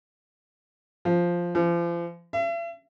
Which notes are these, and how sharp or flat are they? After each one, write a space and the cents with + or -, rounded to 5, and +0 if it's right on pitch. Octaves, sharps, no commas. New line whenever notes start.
F3 +0
F3 -35
E5 +45